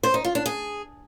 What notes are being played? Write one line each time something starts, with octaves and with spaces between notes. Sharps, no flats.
C5
D#4
F4
D4
G#4